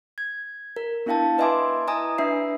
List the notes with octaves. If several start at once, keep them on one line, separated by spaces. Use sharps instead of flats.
G#6
A#4
B3 D4 E4 F5 G5 A5
B4 D#5 E5 G#5 C6 D6
E4 D#5 G#5 A#5 D#6
D4 B4 E5 C7